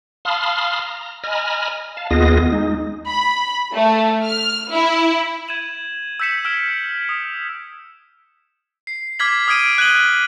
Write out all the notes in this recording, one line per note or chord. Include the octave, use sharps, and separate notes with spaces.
F5 A5 B5 C6 D#6 F6
A#5
D#5 G#5 A#5 B5 F6
F5 A5
D#2 B3 F4 G#4 D#5 A#6
G#3 D#4
B5
A3
F6
E4
G#6 D#7 E7 F#7
E6 G6 B6 C#7 E7
E6 F6 G#6 D7 E7
D#6 C#7
C7
D6 F6 G#6 B6 F#7
D#6 F6 G#6 D7 D#7
F#6 G#6 D#7 F#7 G7